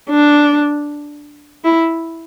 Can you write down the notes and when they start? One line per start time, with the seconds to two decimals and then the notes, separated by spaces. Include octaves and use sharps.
0.10 D4
1.65 E4